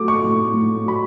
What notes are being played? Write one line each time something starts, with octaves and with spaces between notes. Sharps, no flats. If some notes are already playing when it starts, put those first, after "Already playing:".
Already playing: F#3 A3 D6
C#6
A2
A2
F#3 B5